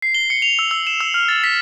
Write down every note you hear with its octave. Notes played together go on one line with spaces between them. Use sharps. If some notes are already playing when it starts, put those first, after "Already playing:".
C7
G7
C#7
F7
E6
E6
E7
E6
F6
A6
B6